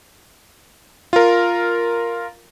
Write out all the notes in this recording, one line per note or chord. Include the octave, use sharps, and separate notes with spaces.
F4 A#4